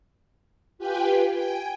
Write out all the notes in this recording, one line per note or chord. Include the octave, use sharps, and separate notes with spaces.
F4 G4 B4 G5 G#5
G5 G#5